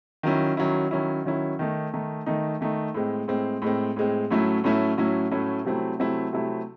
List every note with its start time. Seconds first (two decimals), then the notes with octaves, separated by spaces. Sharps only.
0.23 D#3 F#3 C#4 E4
0.57 D#3 F#3 C#4 E4
0.91 D#3 F#3 C#4 E4
1.25 D#3 F#3 C#4 E4
1.59 D#3 A3 D#4
1.94 D#3 A3 D#4
2.26 D#3 A3 D#4
2.61 D#3 A3 D#4
2.94 A2 G#3 C4
3.28 A2 G#3 C4
3.62 A2 G#3 C4
3.96 A2 G#3 C4
4.31 A2 F#3 A3 C#4 E4
4.64 A2 F#3 A3 C#4 E4
4.97 A2 F#3 A3 C#4 E4
5.31 A2 F#3 A3 C#4 E4
5.65 C3 F#3 A3 C4 E4
5.99 C3 F#3 A3 C4 E4
6.33 C3 F#3 A3 C4 E4